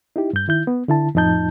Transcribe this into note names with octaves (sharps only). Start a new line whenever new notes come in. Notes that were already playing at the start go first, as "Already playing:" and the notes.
D#4 E4 G4
G2 G6
D#3 E4 G6
B3
D3 E4 A5
F2 A2 F3 D#4 A5 G6